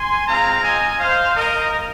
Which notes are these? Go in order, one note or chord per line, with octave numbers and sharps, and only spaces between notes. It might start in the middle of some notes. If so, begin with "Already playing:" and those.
Already playing: G#5 C6
G#3 C4 F4 F5 A#5
D#5 G#5
C5 F5
A#4 D#5